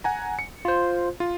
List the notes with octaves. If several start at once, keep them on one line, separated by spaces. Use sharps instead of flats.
F#5 G#5 A#5
C#7
F4 C5
F4